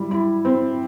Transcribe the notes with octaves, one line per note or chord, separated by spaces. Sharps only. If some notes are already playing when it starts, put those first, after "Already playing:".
Already playing: G3 E4
E4
C4